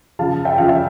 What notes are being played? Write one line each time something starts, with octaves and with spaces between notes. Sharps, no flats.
C#3 F3 F5 A5
E5 G5
C#3 F3 F5
E5